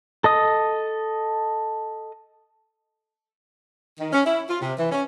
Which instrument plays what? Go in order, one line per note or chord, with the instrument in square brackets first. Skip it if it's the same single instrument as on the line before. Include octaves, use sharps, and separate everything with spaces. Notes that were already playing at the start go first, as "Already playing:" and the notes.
[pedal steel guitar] A4 D#5 D#6
[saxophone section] D#3
C#4
E4
F4
C3
E3
C#4